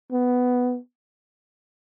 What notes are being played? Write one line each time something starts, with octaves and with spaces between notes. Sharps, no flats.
B3